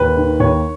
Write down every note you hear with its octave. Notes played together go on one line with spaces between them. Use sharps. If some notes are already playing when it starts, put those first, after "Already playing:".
Already playing: D#2 B4
D#3
D#2 C#5